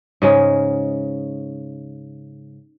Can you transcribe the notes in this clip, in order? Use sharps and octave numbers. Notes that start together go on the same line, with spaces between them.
G#2 C#3 G#3